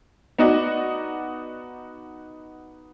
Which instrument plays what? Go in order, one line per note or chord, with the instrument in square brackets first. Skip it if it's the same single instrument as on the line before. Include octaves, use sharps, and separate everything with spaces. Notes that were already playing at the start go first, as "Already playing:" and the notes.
[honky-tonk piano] B3 D#4 F#4 D5 D#5